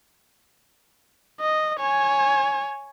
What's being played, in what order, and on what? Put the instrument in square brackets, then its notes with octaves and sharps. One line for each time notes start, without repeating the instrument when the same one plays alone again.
[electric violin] D#5
C#5 G#5